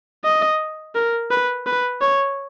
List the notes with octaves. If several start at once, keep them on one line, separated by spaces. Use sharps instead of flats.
D#5
A#4
B4
B4
C#5